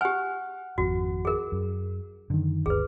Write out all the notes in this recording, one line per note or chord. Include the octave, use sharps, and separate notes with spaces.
G4 F#5 G#5 F6
G#1 F2 F#4
G#4 A#4
F#2
F#2 D3 D#3
G1 D2 G#4 B4